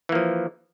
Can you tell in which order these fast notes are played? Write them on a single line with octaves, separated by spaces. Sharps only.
E3 A#3 F3